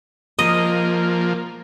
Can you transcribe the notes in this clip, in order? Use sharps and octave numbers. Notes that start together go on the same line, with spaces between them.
F3 A#3 D#5